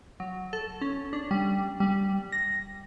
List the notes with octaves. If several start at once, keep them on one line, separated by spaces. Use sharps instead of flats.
F#3
A4
C#4
D4
G3
G3
A#6